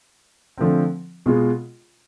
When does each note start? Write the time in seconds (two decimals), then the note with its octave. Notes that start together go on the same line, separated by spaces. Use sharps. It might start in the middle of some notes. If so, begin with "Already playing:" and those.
0.58 D3 F3 A3 C4
1.26 B2 G#3 B3 F4 G#4